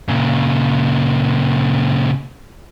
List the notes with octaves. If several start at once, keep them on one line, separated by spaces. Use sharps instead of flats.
A#2 C#3